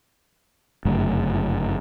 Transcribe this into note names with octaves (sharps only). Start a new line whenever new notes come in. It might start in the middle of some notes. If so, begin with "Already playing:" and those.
G1 F#2 C#3 A3